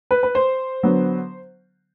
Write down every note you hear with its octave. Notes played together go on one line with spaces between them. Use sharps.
B4
B4
C5
D3 F#3 B3